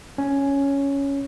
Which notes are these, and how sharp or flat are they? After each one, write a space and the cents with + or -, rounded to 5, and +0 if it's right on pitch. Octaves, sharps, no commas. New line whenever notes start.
C#4 +5